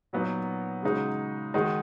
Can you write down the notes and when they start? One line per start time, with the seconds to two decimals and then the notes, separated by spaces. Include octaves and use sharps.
0.13 A#2 F#3 B3 D#4
0.83 C#3 G#3 D#4 F#4
1.54 D#3 G#3 D#4 F#4